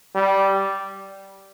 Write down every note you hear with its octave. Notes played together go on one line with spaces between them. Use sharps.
G3